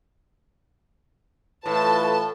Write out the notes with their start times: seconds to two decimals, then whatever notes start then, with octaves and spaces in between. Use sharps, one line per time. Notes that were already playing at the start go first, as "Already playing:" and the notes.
1.66 A2 E3 A3 F4 B4 A5